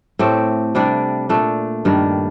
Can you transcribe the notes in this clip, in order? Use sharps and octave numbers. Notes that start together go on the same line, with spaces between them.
A2 A3 C4 G4
C3 G3 D4
A#2 A3 D4
G2 D#3 G3 D4